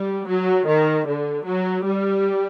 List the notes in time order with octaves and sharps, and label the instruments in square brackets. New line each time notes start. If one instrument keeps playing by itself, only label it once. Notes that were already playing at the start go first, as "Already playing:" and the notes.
Already playing: [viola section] G3
F#3
D#3
D3
F#3
G3